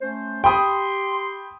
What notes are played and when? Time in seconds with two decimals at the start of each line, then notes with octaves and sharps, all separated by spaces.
0.01 A3 C#4 C5
0.44 G4 G5 B5 C6 D#6